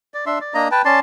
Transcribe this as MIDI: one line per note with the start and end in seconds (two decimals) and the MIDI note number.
0.14 0.25 74
0.26 0.39 62
0.26 0.39 76
0.26 0.39 84
0.41 0.54 74
0.54 0.68 58
0.54 0.68 62
0.54 0.68 75
0.54 0.68 82
0.71 0.82 71
0.71 0.82 79
0.71 0.82 81
0.85 1.00 61
0.85 1.00 74
0.85 1.00 81
0.85 1.00 84